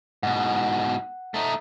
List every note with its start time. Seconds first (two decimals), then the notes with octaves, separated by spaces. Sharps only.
0.23 G#2 B2 F#5
1.34 A3 D#4